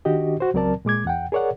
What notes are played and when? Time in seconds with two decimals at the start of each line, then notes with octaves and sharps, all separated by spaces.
0.05 D#3 D4 F#4 G4 D#5
0.40 F#4 C5
0.54 C#2 F#3 C4 A#4 D5 A5
0.85 A#2 G#3 D6 G#6
1.05 E2 F#5 G5
1.32 G#4 A#4 C#5 D5 F#5